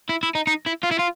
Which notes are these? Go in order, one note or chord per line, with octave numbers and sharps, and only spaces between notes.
E4
E4
D#4
D#4
E4
F4
E4
F4